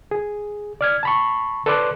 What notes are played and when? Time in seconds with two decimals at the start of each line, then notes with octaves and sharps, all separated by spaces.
0.11 G#4
0.81 D5 F6 G#6
1.03 A5 B5 C#6
1.66 A4 B4 D5 C6 D6 F#6